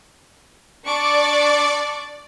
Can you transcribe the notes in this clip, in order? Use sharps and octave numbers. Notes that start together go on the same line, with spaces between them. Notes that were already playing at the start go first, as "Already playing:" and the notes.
D4 D5 C#6 D6